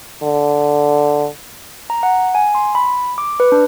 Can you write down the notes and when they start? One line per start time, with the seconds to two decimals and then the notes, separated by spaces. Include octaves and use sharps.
0.23 D3
1.90 A#5
2.03 F#5
2.35 G#5
2.55 C6
2.75 B5
3.18 D6
3.40 B4
3.52 D4